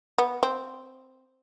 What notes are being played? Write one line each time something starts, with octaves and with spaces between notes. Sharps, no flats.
B3
C4